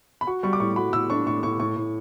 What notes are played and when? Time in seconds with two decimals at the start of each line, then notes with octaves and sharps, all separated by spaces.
0.21 B5
0.27 F#4 C#6
0.43 G3 C#6
0.53 D6
0.60 A2 C#6
0.76 F#4 B5
0.93 A2 E6
1.10 D4 C#6
1.26 A2 C#6
1.43 A2 C#6
1.60 A2 C#6
1.76 A2